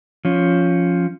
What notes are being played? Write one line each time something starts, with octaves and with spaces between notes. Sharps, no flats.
F3 C#4